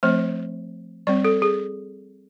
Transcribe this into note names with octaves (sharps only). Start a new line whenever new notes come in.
F3 A3 C4 C5
G3 C4 D5
A4
G#4